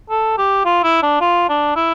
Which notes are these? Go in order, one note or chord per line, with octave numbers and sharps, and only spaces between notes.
A4
G4
F4
E4
D4
F4
D4
E4